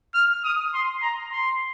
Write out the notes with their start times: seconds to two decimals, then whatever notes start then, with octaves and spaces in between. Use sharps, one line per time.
0.14 F6
0.44 D#6
0.74 C6
1.02 A#5
1.32 C6